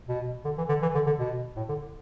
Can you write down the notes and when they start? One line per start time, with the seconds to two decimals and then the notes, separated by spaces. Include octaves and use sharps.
0.08 B2
0.45 D3
0.58 E3
0.69 D3
0.82 E3
0.95 D3
1.06 D3
1.19 B2
1.56 A2
1.69 D3